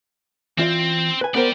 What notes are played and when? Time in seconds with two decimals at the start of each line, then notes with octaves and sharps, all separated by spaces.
0.58 E3 C4 F4 D5
1.21 B4 G#5
1.35 B3 A#4 C5 D5 G5